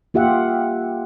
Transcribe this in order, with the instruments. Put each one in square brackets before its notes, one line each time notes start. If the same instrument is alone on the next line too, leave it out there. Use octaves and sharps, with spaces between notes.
[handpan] A#3 F4 G4 E5 F#5